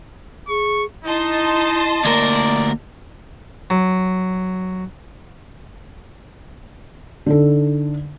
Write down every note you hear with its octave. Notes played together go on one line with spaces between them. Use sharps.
G#4 C#6
D#4 E4 D#5 A5 C6
D2 A#3 A#4 D5
F#3
D3 D#4 A4